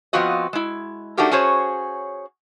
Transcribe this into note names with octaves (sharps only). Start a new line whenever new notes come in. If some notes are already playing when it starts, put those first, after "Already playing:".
F3 B3 C4 F4 F#4 D#5
G#3 E4
A3 D4 D#4 F#4 G4 A#4
C#4 F#4 G#4 C5 C#5